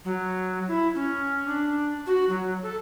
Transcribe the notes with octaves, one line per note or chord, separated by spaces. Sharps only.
F#3
E4
C#4
D4
F#4
F#3
A4